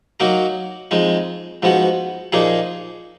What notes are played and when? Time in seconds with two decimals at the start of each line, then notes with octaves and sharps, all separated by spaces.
0.20 F#3 A#3 D#4 F#4 A#4
0.91 F2 F3 G#3 D#4
1.62 G#2 F3 B3 F#4
2.32 A#2 F3 A#3 D#4 G#4